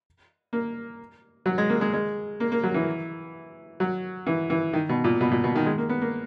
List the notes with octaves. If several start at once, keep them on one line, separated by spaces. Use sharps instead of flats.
A#3
F#3
G#3
A#3
G#3
G#3
A#3
A#3
F#3
E3
F#3
E3
E3
D#3
B2
A#2
B2
A#2
B2
D#3
G#3
A#3
B3
A#3